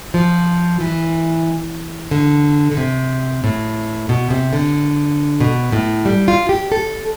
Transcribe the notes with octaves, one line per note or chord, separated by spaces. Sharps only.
F3
E3
D3
D3
C3
A2
B2
C3
D3
B2
A2
G3
F4
G4
A4